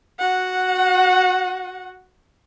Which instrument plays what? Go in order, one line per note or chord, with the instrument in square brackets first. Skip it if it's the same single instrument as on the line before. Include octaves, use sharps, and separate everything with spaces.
[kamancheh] F#4 F#5